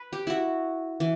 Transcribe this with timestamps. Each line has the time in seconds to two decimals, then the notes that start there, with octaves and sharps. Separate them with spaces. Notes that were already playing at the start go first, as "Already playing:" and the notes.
Already playing: B4
0.13 G4
0.27 E4 F#4
1.00 E3